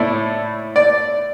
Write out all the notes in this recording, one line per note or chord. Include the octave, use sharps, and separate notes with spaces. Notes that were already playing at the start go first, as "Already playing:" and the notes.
Already playing: A2 A3 E4 D5
D5